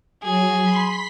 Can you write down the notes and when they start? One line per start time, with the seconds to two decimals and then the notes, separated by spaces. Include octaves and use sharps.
0.23 F#3 G#4
0.61 B5 C6 B6